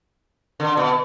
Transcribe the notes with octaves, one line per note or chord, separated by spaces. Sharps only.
D3
B2